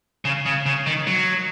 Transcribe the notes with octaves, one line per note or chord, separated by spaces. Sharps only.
C#3
C#3
C#3
D#3
F#3